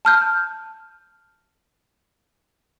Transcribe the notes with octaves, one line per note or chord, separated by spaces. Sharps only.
A5 F6 G6